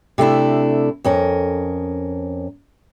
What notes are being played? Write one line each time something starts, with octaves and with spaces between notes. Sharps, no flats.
C3 A3 D4 E4
F2 C#4 A#4